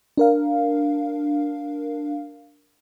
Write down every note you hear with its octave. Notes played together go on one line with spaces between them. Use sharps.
D4 A#4 F5